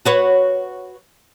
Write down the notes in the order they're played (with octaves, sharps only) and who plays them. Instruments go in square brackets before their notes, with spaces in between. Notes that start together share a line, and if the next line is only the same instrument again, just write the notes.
[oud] F#4 B4 C#5